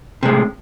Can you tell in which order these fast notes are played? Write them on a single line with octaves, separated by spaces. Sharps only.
C3 G#3 A2